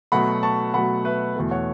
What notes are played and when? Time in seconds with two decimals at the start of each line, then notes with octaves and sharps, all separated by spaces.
0.12 B2 F#3 A3 F#5 B5
0.43 A5 C#6
0.73 B2 F#3 A3 F#5 B5
1.05 B4 E5
1.36 E2 B2 A3
1.51 C#5 F#5